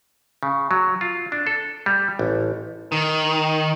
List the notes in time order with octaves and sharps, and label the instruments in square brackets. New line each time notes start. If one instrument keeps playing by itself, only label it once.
[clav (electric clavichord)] C#3
F#3
F4
D4
A4
G3
A1
[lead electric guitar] D#3